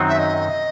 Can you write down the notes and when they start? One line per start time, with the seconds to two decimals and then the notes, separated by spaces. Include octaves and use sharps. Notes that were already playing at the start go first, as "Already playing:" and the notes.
Already playing: F#2 D#3 F#3 C4 D#4
0.09 E5
0.19 D#5